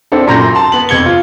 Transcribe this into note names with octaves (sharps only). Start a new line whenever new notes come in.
C4 D4 E4 A4
F#2 A#2 A#5 C6 G6 A#6
A5 C6
B3 F#7
F2 G#6 C#7 G7
F4